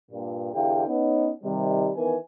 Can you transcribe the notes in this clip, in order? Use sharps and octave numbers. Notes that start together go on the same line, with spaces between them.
G2 A#2
E2 D3 E4 G4 F5 G5
B3 C#4 D#4
C3 D#3 G3
D#3 E3 B3 A#4 B4 G#5